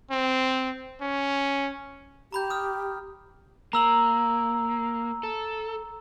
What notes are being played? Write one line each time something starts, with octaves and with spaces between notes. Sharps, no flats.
C4
C#4
G4 A#5 B5 G6
D#6 F6
A#3 A#5 E6 F#7
A4